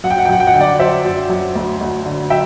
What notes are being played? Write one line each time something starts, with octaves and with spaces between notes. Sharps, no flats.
F#2 F#5
G5
F#5
G5
F#2 F#5
G5
F#5
D3 G5
D5 F#5
F#3 C5 E5
F#2
F#2
D2
D2
D3
F#3 E5 G5